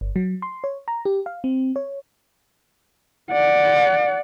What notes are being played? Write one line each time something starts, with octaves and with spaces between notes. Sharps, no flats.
G1
F#3
C6
C#5
A#5
G4
F5
C4
C#5
D5 F#5